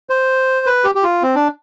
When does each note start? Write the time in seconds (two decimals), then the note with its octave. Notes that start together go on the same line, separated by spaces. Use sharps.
0.10 C5
0.66 B4
0.84 G4
0.95 G4
1.03 F4
1.23 C4
1.35 D4